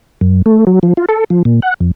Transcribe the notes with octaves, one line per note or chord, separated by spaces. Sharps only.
F#2
A3
F#3
F3
F4
A4
F3
A#2
F#5
F2